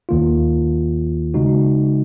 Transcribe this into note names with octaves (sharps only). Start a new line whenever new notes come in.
D#2 D#3 A#3 F4
C#3 G#3 D#4 F#4